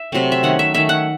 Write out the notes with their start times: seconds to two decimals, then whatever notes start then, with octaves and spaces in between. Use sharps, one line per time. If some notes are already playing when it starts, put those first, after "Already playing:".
Already playing: E5
0.12 C3 F#3 A3 C4
0.32 E5
0.43 D#3 A3 C#4 F#5
0.59 E5
0.74 D#3 A3 C#4 E5
0.89 F#5